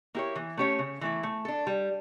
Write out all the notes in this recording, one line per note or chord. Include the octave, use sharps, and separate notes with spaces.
A#3 E4 G4 C#5
E3
A3 C#4 G4 C#5
C#3
E3 A3 E4
A3
D4 A4
G3